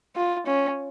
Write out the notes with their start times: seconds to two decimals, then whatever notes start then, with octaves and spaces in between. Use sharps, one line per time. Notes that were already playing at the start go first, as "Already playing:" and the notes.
0.16 F4
0.47 C#4